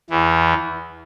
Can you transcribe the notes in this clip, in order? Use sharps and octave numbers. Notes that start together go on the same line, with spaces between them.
E2 E3